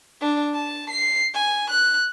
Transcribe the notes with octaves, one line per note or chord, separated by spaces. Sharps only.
D4
A5
C7
G#5
F#6